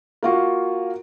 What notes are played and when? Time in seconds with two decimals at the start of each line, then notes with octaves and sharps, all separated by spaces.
0.23 A#3 F4 F#4